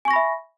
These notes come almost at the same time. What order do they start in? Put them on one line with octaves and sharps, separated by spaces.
G#5 C#6 A#6 B5 E5